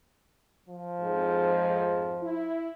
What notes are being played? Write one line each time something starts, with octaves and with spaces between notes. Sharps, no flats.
F3
F2 G#2
E4